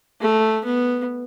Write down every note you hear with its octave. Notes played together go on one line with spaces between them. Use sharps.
A3
B3